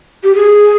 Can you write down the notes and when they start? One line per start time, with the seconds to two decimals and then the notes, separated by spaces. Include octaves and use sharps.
0.24 G4
0.35 G#4